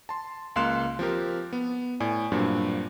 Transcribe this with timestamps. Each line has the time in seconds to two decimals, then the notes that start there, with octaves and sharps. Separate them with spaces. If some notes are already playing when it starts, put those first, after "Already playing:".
0.09 A5 C6
0.56 C#2 A#3 F5 C6 F#6 E7
0.99 F3 C4 G4 A#4
1.53 B3
2.00 A2 D5 G#5
2.32 G2 A#2 F#3 C4 D4